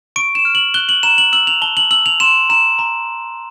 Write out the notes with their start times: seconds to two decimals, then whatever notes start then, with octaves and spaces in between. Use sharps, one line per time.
0.16 C#6 D7
0.35 E7
0.45 F6
0.55 F#7
0.74 F#6 G7
0.89 F#7
1.03 A#5 E7
1.18 F#7
1.33 E6 F#7
1.47 F7
1.62 A5 G7
1.77 F#7
1.91 E6 F#7
2.06 F7
2.20 C6 E7
2.50 A#5 E7
2.79 A#5